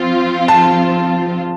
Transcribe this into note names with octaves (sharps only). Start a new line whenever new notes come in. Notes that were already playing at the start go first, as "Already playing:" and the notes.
Already playing: F3 C4 F4
A5